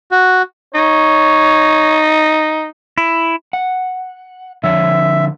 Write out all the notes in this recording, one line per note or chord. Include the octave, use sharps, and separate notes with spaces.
F#4
D#4 C#5
E4
F#5
D3 F3 C#5 E5